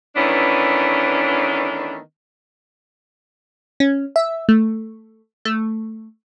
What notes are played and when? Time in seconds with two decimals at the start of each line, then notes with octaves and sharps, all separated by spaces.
0.16 D#3 E3 A3 B3 C#4 D4
3.80 C#4
4.16 E5
4.49 A3
5.45 A3